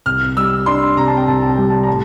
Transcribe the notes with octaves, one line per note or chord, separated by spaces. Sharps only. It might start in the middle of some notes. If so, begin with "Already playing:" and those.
C2 F6
G3 E6
D4 C6
C3 A#5
A5
G5
C2 A5
A5
G3 G5
A5
A#5
A2 A5